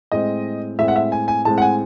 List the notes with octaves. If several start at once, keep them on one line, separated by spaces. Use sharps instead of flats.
A2 G#3 C4 D#5
A2 G#3 C4 E5
F#5
E5
G#5
G#5
A2 G#3 C4 A5
F#5
G#5